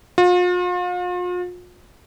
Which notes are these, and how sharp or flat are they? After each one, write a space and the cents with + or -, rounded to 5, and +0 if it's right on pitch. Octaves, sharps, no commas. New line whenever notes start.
F4 +40